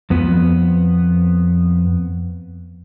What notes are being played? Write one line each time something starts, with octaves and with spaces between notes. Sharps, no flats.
F2 B3